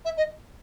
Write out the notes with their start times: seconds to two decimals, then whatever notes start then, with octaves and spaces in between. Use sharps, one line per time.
0.05 E5
0.17 D#5